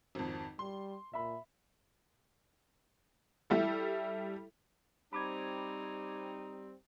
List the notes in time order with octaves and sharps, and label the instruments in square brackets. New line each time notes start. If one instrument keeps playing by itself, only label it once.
[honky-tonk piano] G#1 F2
[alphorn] G3 [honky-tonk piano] C6
[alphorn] A#2 [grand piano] E5 B5
[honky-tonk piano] G3 E4 A4
[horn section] G3 C4 [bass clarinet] D#4 [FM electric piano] B5 D6 G#6